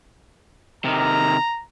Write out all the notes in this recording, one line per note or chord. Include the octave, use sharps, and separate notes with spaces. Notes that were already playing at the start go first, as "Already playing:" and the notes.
C3 D#3 A#5